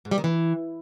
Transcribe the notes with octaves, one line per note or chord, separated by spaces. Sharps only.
G#2
G3
D#3
E3